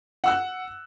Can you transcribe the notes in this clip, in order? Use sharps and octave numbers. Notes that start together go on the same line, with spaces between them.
F#5 E6 F#6